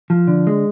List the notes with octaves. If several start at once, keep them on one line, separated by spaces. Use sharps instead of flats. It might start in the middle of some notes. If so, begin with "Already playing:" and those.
F3
D3
G#3